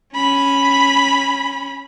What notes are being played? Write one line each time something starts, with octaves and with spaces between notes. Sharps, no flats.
C#4 B5